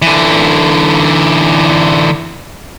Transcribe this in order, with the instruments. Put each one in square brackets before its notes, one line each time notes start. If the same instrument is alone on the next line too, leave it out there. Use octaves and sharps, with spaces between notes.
[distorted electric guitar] D3 E3